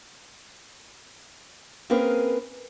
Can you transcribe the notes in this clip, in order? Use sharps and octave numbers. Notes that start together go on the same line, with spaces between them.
A#3 C4 C#4 G#4 A#4 B4